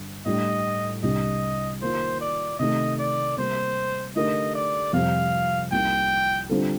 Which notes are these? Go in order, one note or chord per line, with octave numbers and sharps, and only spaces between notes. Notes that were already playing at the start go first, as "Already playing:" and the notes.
Already playing: G2 D3
A2 G3 D4 D#5
C2 C3 G3 D4 D#5
D#3 A#3 F4 C5
D5
C3 D#3 A3 D#5
D5
C3 G3 A#3 C5
D3 A3 D#4 G4 A#4 D#5
D5
F2 C3 G3 C4 F5
C2 C3 F3 A#3 D#4 G5
D3 G3 C4 F4 A4